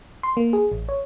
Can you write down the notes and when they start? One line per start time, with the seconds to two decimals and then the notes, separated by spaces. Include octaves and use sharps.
0.23 C6
0.37 A#3
0.53 G#4
0.72 A1
0.89 C#5